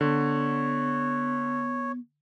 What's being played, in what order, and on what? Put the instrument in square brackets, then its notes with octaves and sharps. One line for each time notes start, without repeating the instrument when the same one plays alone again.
[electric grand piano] D3 [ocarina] B3 [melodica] C#5